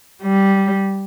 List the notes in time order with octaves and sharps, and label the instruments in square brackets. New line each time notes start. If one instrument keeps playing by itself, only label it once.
[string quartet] G3